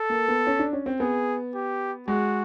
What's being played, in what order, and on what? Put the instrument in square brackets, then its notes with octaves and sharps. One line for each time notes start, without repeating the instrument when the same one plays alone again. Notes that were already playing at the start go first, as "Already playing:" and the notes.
Already playing: [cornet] A4
[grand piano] A#3
B3
C#4
D4
C#4
C4
[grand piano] B3 [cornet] G#4
[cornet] G4
[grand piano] G#3 [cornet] F#4